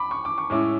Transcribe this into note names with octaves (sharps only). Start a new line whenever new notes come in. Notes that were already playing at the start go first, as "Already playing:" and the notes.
Already playing: B5 D6
C#6
D6
C#6
A2 G#3 C#4 E4 D6